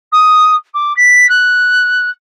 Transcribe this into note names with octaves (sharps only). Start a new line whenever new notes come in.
D#6
D6
B6
F#6